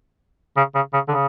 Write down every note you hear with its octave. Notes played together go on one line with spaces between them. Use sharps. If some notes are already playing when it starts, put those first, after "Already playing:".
C#3
C#3
C#3
D3
C#3